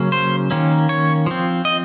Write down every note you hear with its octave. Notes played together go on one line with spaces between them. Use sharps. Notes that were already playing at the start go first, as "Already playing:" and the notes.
Already playing: C#3 F#3 A#3 C#4
C5
D#3 A#3 C#4
C#5
F3 C4
D#5